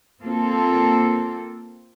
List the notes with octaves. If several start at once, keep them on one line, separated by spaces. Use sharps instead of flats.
A#3 C4 F4 A4